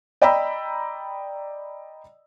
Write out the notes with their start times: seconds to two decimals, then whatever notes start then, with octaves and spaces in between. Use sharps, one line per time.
0.21 D5 D#5 G5 A#5 B5 E6